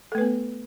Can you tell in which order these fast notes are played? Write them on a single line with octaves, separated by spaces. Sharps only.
A4 A3 B4 B3